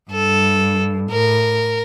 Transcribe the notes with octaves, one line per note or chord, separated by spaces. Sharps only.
G2 A4
A2 A#4